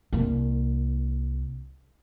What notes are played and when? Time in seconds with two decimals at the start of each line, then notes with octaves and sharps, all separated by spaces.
0.13 C2 A#3